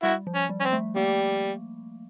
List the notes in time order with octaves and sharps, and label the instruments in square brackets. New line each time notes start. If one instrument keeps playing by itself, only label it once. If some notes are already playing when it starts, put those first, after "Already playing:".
[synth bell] G3 [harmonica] E4 F#4
[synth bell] F3
[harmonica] C#4
[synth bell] G3
[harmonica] C#4
C4
[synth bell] A3
[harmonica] G3 [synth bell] A#3